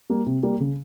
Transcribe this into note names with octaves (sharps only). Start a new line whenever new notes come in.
G3 A#3
C3
G3 A#3
C#3